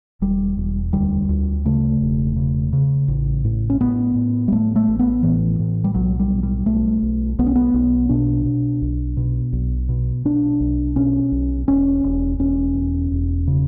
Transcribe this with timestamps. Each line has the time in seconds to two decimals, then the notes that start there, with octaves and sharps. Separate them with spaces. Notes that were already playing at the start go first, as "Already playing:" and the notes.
0.21 E1 G3
0.57 E1
0.93 D2 G3
1.29 D2
1.65 C#3 A3
2.01 E1
2.36 C#3
2.73 C#3
3.08 A1
3.45 A2
3.70 C#4
3.80 A2 B3
4.15 A2
4.48 G3
4.52 A2 A3
4.76 A3
4.88 A1
4.99 B3
5.23 A2 E3
5.60 A2
5.84 G3
5.95 B1 F#3
6.19 G3
6.31 B2
6.43 G3
6.66 B1 A3
7.03 B1
7.39 B1 B3
7.46 C#4
7.55 B3
7.74 B1
8.09 B2 D4
8.45 B2
8.82 B1
9.17 B2
9.53 B1
9.89 B2
10.25 B2 D4
10.60 B1
10.96 B2 C#4
11.32 B1
11.68 E1 C#4
12.03 E1
12.39 E1 C#4
12.75 E2
13.12 E1
13.47 C#3